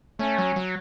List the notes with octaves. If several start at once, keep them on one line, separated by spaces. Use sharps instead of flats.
A3 C#4
F#3
F#3